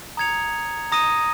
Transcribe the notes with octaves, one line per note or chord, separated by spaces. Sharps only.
A#5 D#6 G#6 C#7 F7
A#5 D#6 A#6 D#7